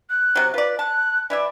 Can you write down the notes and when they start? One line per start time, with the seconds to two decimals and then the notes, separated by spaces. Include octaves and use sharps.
0.10 F#6
0.35 C3 F#3
0.54 F4 B4 D5
0.79 A5 F#6
1.30 E3 E4 D5 E5